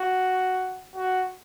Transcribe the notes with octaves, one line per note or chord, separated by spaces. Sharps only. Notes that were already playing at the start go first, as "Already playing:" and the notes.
Already playing: F#4
F#4